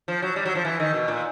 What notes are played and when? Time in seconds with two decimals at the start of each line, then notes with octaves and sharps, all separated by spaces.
0.08 F3
0.22 F#3
0.36 G3
0.45 F#3
0.55 F3
0.65 E3
0.80 D#3
0.94 B2
1.08 A#2